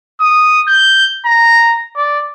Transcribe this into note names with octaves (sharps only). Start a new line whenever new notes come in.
D#6
G6
A#5
D5